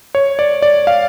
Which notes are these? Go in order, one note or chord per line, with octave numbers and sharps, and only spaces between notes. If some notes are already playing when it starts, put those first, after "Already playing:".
C#5
D5
D5
F5